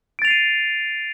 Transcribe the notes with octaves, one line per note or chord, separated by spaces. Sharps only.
A6 C7 D7 D#7 F7